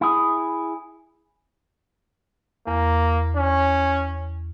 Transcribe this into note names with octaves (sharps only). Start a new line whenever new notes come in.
E4 G#4
E2 A#3
C#4